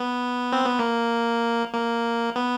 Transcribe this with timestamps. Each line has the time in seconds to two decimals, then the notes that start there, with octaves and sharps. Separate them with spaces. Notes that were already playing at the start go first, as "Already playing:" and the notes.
Already playing: B3
0.52 C4
0.66 B3
0.79 A#3
1.74 A#3
2.36 B3